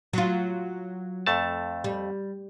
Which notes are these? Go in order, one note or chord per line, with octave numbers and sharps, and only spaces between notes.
F#3 F4
F2 A3 A5
G3